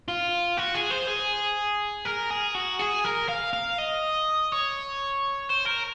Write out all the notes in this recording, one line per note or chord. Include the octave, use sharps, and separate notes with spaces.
F4
F#4
G#4
C5
G#4
A#4
G#4
F#4
G#4
A#4
F5
F5
D#5
C#5
C5
A#4